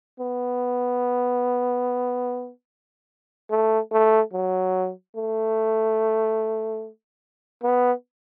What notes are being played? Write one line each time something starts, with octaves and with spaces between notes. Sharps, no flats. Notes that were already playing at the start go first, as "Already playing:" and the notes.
B3
A3
A3
F#3
A3
B3